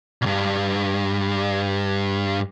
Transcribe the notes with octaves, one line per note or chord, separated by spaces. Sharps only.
B1 G2